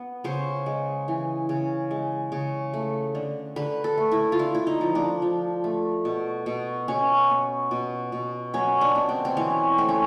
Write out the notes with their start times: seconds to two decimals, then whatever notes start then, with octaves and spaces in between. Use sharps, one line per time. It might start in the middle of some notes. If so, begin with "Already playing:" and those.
Already playing: B3
0.24 C#3 C5
0.66 G#3
1.08 E3
1.49 C#3
1.91 G#3
2.32 C#3
2.74 A3
3.15 D3
3.56 D3 B4
3.84 A4
3.98 A3
4.12 E4
4.32 F4
4.39 D3 E4
4.55 E4
4.67 D#4
4.81 F3
4.95 D4
5.22 F3
5.64 A3
6.05 B2
6.46 B2
6.88 B2 C#4
7.30 B3
7.71 B2
8.12 B2
8.54 F#3 C#4
8.81 D4
8.95 B2
9.09 C4
9.25 C4
9.37 E3 C#4
9.78 A3 C4
9.89 C#4